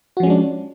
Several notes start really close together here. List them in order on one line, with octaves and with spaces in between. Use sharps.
F#4 F3 C#4 G#3 D4